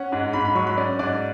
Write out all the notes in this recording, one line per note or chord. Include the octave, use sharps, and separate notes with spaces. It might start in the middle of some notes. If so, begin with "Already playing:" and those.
Already playing: C#4 F#5
G#2
G#2 B5
B5
F#3 C#6
B5
C#4 D5
G#2 D5